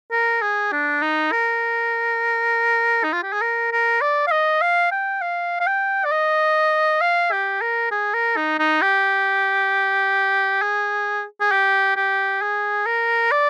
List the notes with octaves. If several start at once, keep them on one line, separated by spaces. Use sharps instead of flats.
A#4
G#4
D4
D#4
A#4
D#4
F4
G4
G#4
A#4
A#4
D5
F5
D#5
F5
G5
F5
F5
G5
D5
D#5
F5
G4
A#4
G#4
A#4
D#4
D#4
G4
G#4
G#4
G4
G4
G#4
A#4
D5